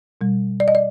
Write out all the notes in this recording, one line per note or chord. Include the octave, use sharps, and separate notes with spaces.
B2 G3
D5
D#5
D5